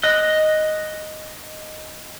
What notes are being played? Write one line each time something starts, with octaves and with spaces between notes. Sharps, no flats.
D#5 F#6